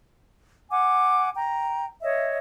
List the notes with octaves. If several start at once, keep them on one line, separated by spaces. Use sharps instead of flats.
F#5 G#5 D6
G5 A#5
C#5 D#5 E5